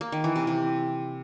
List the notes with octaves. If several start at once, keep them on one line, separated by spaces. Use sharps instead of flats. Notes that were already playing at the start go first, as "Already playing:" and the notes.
A#3
D#3
E3
C3
C3